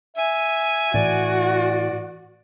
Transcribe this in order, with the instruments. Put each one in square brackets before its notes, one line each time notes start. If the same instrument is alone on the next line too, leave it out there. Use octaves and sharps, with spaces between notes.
[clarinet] E5 [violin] G#5
[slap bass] A2 E3 [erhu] F#4 [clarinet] D5